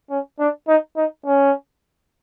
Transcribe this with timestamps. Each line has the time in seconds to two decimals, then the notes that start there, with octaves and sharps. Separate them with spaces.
0.10 C#4
0.39 D4
0.68 D#4
0.97 D#4
1.25 C#4